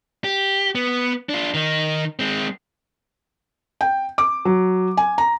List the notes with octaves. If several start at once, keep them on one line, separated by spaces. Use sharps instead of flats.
G4
B3
D4 F4
D#3 D#4
G#3 C4
G5
D6
F#3
G#5
A#5